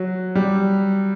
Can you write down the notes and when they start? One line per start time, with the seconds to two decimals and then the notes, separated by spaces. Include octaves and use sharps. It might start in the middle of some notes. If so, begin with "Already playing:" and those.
Already playing: F#3
0.35 G3